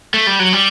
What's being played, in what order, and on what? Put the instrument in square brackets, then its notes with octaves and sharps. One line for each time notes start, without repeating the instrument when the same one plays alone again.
[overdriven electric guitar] A3
G3
F#3
G3